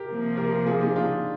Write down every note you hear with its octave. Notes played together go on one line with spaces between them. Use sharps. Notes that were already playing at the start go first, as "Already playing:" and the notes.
Already playing: G4 A#4
C3 F3 A#3
G4 A#4
F4 G#4
D#4 G4
D4 F4